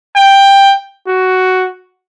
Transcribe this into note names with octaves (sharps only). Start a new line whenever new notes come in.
G5
F#4